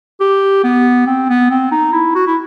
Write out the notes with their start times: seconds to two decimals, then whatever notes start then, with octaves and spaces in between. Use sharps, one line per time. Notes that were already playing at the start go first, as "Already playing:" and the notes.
0.20 G4
0.64 B3
1.06 C4
1.29 B3
1.51 C4
1.71 D#4
1.93 E4
2.15 F#4
2.27 E4